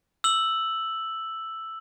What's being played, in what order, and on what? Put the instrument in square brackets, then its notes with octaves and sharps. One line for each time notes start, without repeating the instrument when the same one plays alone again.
[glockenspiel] E6 F#7